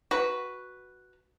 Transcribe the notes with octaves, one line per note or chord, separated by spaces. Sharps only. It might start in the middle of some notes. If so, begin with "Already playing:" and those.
F#4 B4